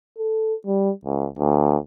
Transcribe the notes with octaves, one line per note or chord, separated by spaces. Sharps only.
A4
G3
C#2
D2